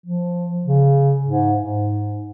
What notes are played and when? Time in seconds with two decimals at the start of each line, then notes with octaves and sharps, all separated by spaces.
0.06 F3
0.66 C#3
1.27 G#2
1.62 G#2